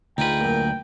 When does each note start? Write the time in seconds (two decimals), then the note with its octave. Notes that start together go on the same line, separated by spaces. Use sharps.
0.18 D2 D#4 F4 G#4 B4 G5
0.41 F#2 A#2